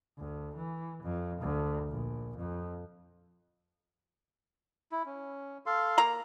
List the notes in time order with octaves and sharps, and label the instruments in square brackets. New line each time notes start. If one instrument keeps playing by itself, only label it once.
[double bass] D2
E3
F2
D2
A#1
F2
[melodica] E4
C#4
A4 F5 C6
[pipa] A#3 A#5